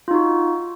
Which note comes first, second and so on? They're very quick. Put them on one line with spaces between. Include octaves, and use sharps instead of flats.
F4 D#4 F#4